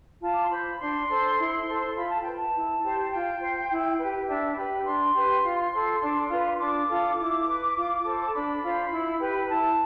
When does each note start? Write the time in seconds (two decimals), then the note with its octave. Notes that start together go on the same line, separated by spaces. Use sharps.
0.21 F4 A5
0.33 D6
0.42 C6
0.49 C5 B5
0.79 D4 C6
1.07 A4 C5
1.37 E4
1.65 A4 C5
1.94 F4 B5
2.08 A5
2.22 B4 G5
2.35 A5
2.53 E4
2.81 G4 C5
3.10 F4 G5
3.40 C5
3.68 E4
3.98 G4 B4
4.26 D4 E5
4.55 G4 B4 B5
4.84 D4 C6
5.13 G4 B4
5.42 F4
5.71 A4 C5
6.00 D4
6.29 F4 B4
6.58 D4 D6
6.87 F4 A4
7.16 E4
7.45 B4
7.74 F4
8.03 A4 C5
8.23 A5
8.32 D4 B5
8.61 F4 C5
8.90 E4
9.19 G4 B4
9.41 B5
9.47 E4 A5